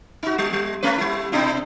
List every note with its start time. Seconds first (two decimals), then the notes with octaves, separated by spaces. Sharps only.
0.23 D#4 F#4
0.38 G3
0.53 G3
0.83 A3 C#4 B4
0.98 G3 E4
1.32 B2 D4 E4